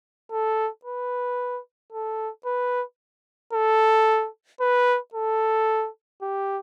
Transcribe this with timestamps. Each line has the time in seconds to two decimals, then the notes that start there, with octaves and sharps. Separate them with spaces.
0.31 A4
0.85 B4
1.92 A4
2.45 B4
3.53 A4
4.61 B4
5.14 A4
6.22 G4